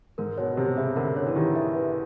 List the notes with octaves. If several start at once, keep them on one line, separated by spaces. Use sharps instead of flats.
G#2 A#4
B2 C#5
C3 G4
C#3 E5
D3 A#4
C#5
E3
D#3 G4
E5
B4